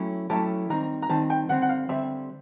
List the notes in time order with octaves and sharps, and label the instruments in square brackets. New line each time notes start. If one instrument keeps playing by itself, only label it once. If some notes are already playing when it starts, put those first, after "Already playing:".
Already playing: [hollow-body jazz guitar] F#3 A3 C#4 E4 G4
[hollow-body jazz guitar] F#3 A3 C#4 E4 G4 [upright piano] A5
[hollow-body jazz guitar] D#3 G3 C4 [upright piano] A#5
[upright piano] A#5
[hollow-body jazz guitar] D#3 G3 C4 [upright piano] A5
[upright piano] G5
[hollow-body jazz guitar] D3 G3 C4 [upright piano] F#5
[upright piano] F#5
F5
[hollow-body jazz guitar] D3 G3 C4 [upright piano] E5